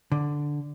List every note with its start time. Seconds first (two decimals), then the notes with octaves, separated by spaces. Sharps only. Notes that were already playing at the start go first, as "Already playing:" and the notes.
0.12 D3